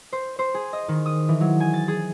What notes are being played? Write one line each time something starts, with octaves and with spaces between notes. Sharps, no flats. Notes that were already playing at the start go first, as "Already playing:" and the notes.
C5
C5
G#4
D#5
D#3
D#6
E3
F#3
G#5
A6
G#4